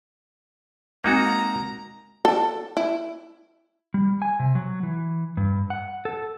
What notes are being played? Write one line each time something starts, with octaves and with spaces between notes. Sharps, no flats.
G#3 A#3 C4 D#4 F#4 A#5
A4
E4
G3
G#5
C3
F#3
E3
G2
F#5
A4